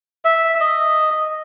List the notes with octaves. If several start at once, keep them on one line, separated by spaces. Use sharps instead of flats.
E5
D#5